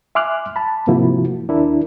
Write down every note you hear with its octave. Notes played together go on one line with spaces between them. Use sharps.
E5 G#5 C6 D6 F6 F#6
A5 B5
G#2 C3 F3 A#3 E4 F#4
D#2 D4 E4 A#4